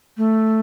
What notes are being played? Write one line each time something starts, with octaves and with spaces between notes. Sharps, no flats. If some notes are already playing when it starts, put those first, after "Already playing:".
A3